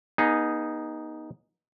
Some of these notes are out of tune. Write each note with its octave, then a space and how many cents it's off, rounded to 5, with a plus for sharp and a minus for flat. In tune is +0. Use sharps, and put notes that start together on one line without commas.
B3 -35 D#4 +0 G#4 -10